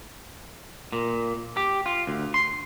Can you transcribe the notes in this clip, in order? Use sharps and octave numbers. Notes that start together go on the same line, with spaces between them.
A#2
G4
F4
D2
C6